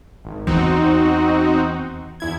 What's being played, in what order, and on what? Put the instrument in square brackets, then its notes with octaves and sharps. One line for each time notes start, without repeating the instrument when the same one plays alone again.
[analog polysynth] G#1
[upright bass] E2 [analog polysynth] C4 D#4 F#4
[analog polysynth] E2 E4 G#6